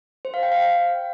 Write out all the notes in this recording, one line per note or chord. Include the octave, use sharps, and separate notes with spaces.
C5
F5
G5
F5